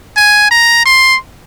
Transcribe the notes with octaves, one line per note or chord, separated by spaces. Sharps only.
G#5
A#5
C6